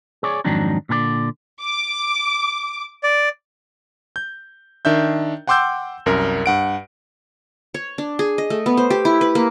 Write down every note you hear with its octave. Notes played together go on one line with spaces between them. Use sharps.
G#4 C#5 D5
F2 G#2 D#3 F#3 D4 D#4
A#2 D3 A#4 D5
D6
D5
G6
D#3 D4 E5 G6
F#5 G5 C6 D6 E6 G6
C2 F#2 A#4
G2 F#5 D7
C#5
D4
G#4
D#5
A3
B3
C5
G4
E4
B4
A#3